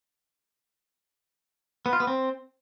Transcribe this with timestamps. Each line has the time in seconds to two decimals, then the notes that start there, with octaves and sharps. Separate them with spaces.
1.86 B3
1.93 F4
2.00 B3
2.07 C4